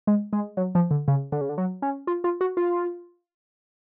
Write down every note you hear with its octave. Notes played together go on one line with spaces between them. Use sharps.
G#3
G#3
F#3
F3
D3
C#3
D3
C#3
D3
F#3
C#4
F4
F4
F#4
F4